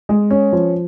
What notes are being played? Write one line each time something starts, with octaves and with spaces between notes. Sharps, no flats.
G#3
C#4
F3